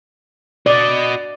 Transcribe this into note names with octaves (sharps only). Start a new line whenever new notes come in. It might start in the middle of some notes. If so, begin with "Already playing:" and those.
F#4 D5 D#5